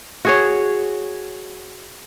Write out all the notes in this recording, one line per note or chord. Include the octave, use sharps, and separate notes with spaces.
F#4 G#4 C#5